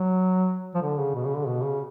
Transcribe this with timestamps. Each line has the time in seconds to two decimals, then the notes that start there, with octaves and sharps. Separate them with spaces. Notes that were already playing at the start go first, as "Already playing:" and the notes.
Already playing: F#3
0.75 F3
0.82 D3
0.99 C#3
1.15 B2
1.26 C#3
1.37 D3
1.47 B2
1.64 C#3